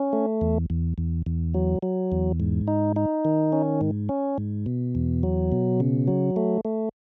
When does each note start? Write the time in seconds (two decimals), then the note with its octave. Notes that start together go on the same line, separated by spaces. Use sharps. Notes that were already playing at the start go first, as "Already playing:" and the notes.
Already playing: C#4
0.13 A3
0.41 E2
0.70 E2
0.98 E2
1.26 E2
1.54 F#3
1.83 F#3
2.12 E2
2.40 G#2
2.68 D#4
2.96 D#4
3.25 D#3
3.52 C#4
3.81 G#2
4.09 C#4
4.38 G#2
4.66 B2
4.95 E2
5.23 F#3
5.52 B2
5.80 C#3
6.08 F#3
6.36 A3
6.65 A3